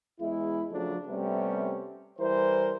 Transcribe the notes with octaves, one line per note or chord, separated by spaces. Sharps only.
E2 G#3 E4
C#3 F3 F#3 A3 D4
C3 G3 A3 B3 C#4
E3 G3 A#4 C5